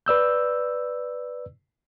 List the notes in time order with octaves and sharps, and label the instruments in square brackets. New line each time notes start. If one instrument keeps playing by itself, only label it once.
[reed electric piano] B4 D5 E6 G6